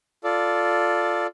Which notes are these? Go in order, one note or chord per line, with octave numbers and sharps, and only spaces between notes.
F4 A4 D5